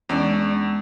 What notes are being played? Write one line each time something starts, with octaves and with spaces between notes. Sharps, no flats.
E2 G#3 C#4 D4 D5